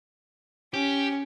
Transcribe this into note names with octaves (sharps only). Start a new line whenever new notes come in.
C#4 G4